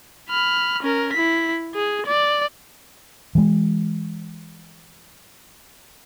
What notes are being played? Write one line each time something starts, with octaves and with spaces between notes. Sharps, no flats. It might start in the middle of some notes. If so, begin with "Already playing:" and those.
B5 F6
C#4 A#4
E4 B6
G#4
D5
E3 G#3